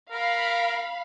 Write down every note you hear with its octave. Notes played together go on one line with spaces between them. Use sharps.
A#4 F5 B5